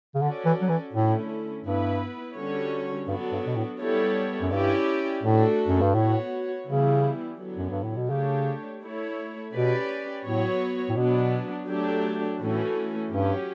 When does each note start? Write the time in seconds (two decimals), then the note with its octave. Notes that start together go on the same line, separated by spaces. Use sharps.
0.15 C#3
0.22 D3 C#4 F#4 A4 D5
0.45 E3
0.61 F#3
0.69 E3
0.93 A2 D3 A3 C#4 E4
1.64 G2 B3 E4 B4
2.36 D3 G3 C#4 F#4 C#5
3.08 G2 F#3 B3 D4 F#4 A4
3.32 G2
3.46 B2
3.56 A2
3.79 G3 B3 E4 A4 C#5
4.42 F#2
4.51 G2 C#4 E4 G4 D5
5.23 A2 A3 D4 F#4 A4
5.68 F#2
5.81 G2
5.94 A2 B3 F#4 C#5
6.66 C#3 E3 G3 B3 E4
7.38 D3 F#3 B3
7.57 F#2
7.70 G2
7.83 A2
7.96 B2
8.10 C#3 A3 D4 G4 C#5
8.82 A3 E4 A4 C#5
9.53 B2 C#4 G4 B4 D5
10.25 A2 F#3 B3 F#4 C#5
10.89 A2
10.96 B2 F#3 B3 D4
11.67 F#3 A3 D4 G4
12.40 A2 E3 A3 C#4 F#4
13.11 G2 F#3 C#4 G4